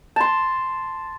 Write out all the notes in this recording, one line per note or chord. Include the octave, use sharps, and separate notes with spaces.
A5 C6